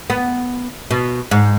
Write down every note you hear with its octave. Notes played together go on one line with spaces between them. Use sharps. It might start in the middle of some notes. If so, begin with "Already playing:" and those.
B3
B2
G#2